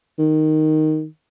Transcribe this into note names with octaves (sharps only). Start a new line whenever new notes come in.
D#3